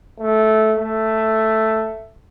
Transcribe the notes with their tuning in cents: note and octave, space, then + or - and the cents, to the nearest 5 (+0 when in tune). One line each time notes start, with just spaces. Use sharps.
A3 -10
A3 +5